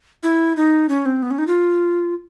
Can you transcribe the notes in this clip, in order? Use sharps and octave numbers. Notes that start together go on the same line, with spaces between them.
E4
D#4
C#4
C4
B3
C#4
D#4
F4